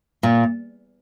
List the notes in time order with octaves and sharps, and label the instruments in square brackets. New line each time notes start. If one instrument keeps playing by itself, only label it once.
[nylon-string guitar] A#2